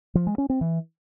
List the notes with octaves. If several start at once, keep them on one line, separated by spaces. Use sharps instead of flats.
F3
G#3
C#4
C4
E3